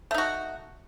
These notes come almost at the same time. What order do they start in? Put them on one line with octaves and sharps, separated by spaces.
A3 D#4 F#4